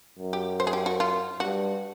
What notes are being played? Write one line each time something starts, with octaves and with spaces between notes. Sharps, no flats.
F#2
G4
C5
G#4
G4
F#4
F4
G2 F#4